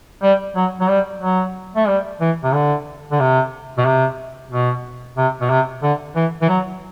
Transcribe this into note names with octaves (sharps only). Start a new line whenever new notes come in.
G3
F#3
F#3
G3
F#3
A3
G3
E3
C3
D3
D3
C3
B2
C3
B2
C3
B2
C3
D3
E3
E3
F#3